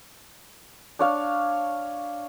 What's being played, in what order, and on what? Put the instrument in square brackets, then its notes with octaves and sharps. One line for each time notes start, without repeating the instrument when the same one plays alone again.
[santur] D4 C#5 F5